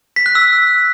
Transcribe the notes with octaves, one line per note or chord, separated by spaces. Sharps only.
B6
F#6
E6